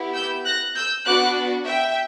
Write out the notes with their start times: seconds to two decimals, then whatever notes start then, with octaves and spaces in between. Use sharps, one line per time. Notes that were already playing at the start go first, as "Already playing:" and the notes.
Already playing: B3 E4 G4
0.15 E6 G6
0.45 F#6 A#6
0.76 E6 G6
1.06 B3 D4 F#4 D6 F#6
1.66 E5 G5